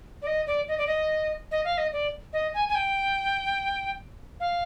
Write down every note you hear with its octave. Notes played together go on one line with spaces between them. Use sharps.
D5
D#5
D5
D#5
D5
D#5
D#5
F5
D#5
D5
D#5
G#5
G#5
G5
F5